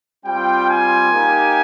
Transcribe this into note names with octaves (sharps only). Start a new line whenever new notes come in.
G3 C4 F4 G5
G#5
A#3 D#4 G4